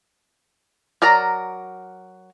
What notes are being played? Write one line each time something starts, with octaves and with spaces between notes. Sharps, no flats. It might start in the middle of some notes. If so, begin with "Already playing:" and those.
F#3 A#4 D5 A#5